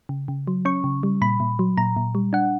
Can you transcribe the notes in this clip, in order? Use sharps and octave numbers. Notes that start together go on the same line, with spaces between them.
C#3
C#3
F#3
C#4 C#6
C#3
G3
A#2 B5
A#2
F#3
A#2 A#5
A#2
G3
D4 F#5